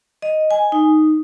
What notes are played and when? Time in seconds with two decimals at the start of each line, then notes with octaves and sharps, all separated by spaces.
0.22 D#5
0.51 G#5
0.72 D#4